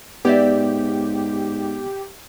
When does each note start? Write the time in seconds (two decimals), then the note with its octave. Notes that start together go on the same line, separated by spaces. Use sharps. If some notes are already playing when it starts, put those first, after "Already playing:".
0.25 G#2 B3 G4 C#5 D5 E5